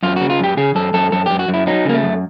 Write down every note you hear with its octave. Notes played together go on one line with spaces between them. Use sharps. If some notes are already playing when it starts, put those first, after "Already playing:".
F#2 F4
C#3 F#4
F4
F#2 G4
C#3 G#4
F#2 A4
F#2 A4
F#2 A4
F#2 G4
F#4
F#2
E4
F#3 D#4
C#3 A#3
A3
F#2